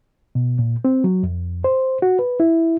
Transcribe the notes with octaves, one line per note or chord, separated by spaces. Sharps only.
B2
A#2
C4
F#3
F2
C5
F#4
B4
E4